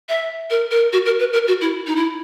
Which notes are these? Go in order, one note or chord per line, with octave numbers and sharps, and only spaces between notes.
E5
A#4
A#4
F#4
A#4
B4
A#4
F#4
E4
D#4
E4